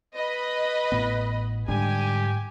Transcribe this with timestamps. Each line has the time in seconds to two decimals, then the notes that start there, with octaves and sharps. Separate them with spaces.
0.15 B4 D#5 B5
0.92 A1 A2 B3
1.68 G#2 D3 G3 D4 G4 G#5